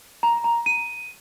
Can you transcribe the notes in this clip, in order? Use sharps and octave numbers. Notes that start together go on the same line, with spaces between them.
A#5
A#5
D#7